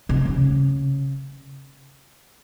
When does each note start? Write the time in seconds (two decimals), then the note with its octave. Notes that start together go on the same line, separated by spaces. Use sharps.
0.09 C3
0.25 C#3